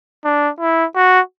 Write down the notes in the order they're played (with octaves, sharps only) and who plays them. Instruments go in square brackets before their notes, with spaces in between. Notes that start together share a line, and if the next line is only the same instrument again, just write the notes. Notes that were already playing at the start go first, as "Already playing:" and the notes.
[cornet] D4
E4
F#4